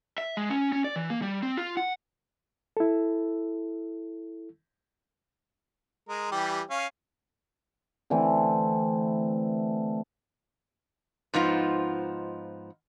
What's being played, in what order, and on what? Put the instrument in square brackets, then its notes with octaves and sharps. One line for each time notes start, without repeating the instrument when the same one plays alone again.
[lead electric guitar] E5
G#3
C#4
C#4
D5
E3
A#3
G3
C4
F4
F#5
[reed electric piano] E4 A4
[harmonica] G#3 A#4
E3 G3 G4
C#4 F5
[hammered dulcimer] D3 E3 A3 C4
[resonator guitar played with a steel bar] G#2 F3 B3 D#4 F4